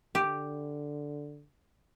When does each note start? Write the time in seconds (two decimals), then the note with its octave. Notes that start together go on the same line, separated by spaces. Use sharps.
0.15 D3 G4